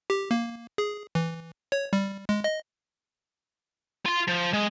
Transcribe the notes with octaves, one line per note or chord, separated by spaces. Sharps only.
G4
A#3
G#4
E3
C#5
G3
G#3
D#5
F4 C6
F3
G#3